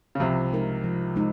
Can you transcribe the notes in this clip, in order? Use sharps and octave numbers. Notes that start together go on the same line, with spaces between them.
C#3
C2 C3 F3
G#3 D#4 A#4
F3
G#3 D#4